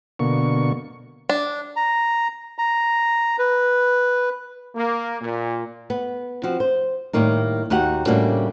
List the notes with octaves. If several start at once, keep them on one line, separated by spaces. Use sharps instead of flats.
B2 D3 A#3 C#6
D4
A#5
A#5
B4
A#3
A#2
B3
F3 C4 F#4
C5
A2 D#3 G3 A#3 D#4
D#2 D#4 F#4 G4 F#5
A2 C#3 G3 A#3 D4 F#4